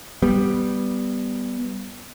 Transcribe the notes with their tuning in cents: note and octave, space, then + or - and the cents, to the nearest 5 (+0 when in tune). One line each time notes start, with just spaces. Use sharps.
G3 +0 B3 +0